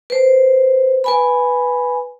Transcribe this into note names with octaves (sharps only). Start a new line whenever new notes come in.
B4 C5
B4 G#5 B5